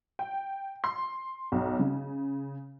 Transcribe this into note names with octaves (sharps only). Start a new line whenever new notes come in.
G5
C6
B1
C#3